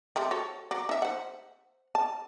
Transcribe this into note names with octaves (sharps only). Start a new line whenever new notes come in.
G3 A3 C4
F#4 A4 C#5
F#3 D5
D#4 E5
C5 F#5
A5